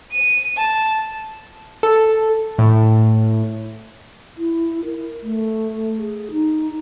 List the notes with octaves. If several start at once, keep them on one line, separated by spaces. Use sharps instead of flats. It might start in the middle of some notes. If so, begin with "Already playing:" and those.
D#7
A5
A4
A2
E4
A#4
A3
G#4
D#4